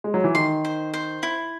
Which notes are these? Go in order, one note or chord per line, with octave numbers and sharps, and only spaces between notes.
G#3
F#3
E3
D#3 C6
C5
C5
E4